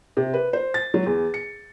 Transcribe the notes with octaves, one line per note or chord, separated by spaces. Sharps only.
C3
B4
C5
A6
F#3
E2
C#7